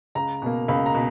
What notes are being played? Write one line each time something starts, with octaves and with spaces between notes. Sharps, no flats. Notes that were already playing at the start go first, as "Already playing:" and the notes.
C#2 A#5
B2 A#3
C#2 B5
A#5
B2